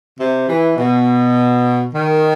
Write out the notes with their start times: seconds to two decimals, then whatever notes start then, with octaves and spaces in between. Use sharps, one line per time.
0.18 C3
0.48 E3
0.77 B2
1.93 D#3